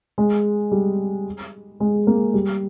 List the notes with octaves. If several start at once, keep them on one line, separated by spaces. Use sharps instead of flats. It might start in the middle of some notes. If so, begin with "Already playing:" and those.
G#3
G3
G#3
A#3
G3